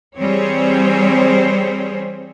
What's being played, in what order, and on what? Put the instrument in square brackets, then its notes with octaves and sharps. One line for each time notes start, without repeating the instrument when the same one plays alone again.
[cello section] E3 G3 C4 G#4 C5 C#5